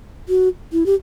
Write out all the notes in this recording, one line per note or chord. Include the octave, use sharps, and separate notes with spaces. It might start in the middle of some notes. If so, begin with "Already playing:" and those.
F#4
E4
G4